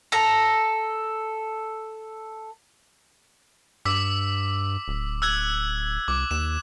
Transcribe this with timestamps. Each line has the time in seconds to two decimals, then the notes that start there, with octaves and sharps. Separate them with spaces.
0.12 A4 A#5
3.85 G2 D6 E6 B6
4.88 D1
5.22 E6 F#6 G#6
6.08 C2 D6
6.31 D#2 E7